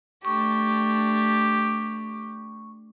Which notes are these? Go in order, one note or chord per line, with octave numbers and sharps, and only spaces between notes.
A3 D4 G4 C#6